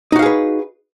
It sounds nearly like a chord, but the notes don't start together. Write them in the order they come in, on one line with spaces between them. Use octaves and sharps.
D#4 F#4 F5 G#4 B4